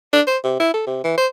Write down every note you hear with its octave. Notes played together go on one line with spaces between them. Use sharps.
D4
C5
C3
E4
A4
C3
E3
C5